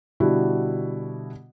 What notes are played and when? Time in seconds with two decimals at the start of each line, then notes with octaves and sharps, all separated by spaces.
0.20 B2 D3 G3 D4 E4 F#4